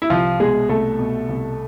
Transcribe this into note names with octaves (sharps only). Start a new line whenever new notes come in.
E4
C2 F3 F4
B2 G#3 G#4
C2 A3 A4
B2
C2